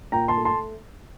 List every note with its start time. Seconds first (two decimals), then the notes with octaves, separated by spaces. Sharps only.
0.12 A#2 G5 A#5
0.28 A5 C6
0.37 A3
0.45 A5 C6